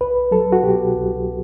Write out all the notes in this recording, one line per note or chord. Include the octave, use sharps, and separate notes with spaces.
C2 B4
F#3 A4
F#4
B2 G4
C2